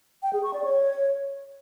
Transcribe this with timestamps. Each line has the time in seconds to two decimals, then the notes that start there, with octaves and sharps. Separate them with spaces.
0.23 G5
0.33 G#4
0.43 C#6
0.54 D5
0.64 C#5